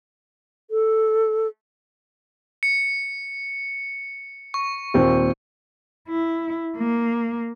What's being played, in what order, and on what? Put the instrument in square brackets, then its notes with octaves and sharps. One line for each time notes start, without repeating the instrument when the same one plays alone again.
[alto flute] A4
[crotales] C#7
C#6
[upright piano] D#2 A#2 C4
[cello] E4
A#3